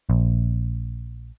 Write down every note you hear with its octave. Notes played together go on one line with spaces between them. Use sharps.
A#1